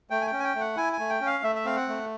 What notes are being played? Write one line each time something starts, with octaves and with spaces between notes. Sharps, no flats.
A3 G5
G#5
G5
C#4
G#5
G5
A3
F#5
E4 G#5
G#5
A3
G5
C#4
F5
A3 E5
E5
C4 F5
F#5
A3